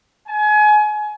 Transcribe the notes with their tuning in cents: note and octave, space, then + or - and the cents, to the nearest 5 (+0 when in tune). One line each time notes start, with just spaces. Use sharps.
G#5 +30